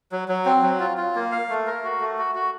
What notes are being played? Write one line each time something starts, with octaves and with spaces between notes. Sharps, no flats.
F#3
F#3
C4
F#3
F4
F4
A#3
F5
A3
A#4
F#4
A3
F#4
F#4